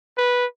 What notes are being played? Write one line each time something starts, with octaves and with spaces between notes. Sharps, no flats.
B4